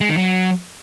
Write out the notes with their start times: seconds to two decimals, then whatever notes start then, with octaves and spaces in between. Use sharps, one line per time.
0.01 G#3
0.09 D#3
0.17 F#3